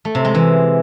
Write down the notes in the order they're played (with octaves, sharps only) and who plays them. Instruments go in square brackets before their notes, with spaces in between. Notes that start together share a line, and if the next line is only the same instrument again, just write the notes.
[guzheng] A3
C3
G#3
E3